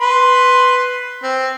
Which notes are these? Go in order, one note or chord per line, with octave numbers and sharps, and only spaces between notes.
B4 B5 C6
C4